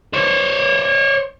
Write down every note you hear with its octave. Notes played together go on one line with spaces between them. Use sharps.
C5 C#5